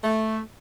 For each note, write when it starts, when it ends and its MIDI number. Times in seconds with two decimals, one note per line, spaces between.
0.04 0.39 57